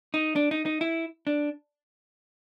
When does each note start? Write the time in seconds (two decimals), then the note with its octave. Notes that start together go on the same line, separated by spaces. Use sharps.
0.14 D#4
0.36 D4
0.51 D#4
0.66 D#4
0.81 E4
1.27 D4